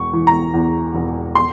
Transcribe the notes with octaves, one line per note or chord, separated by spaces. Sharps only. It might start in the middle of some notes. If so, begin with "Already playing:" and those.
Already playing: E1 C#6
E3
A#5
E2
E1
C6